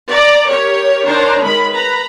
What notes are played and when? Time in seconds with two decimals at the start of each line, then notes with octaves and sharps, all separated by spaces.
0.12 D5 A#5
0.48 G4 A#4 C#5
1.06 D#3 D4 C5 C#5 A#5
1.44 D#3 G#3 A#4 B5
1.72 B4 A#5 B5